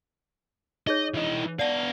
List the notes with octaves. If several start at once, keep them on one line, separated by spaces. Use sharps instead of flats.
D#4 G#4 C#5 D#5
E3 D#5
B3 D5 F5 F#5 A5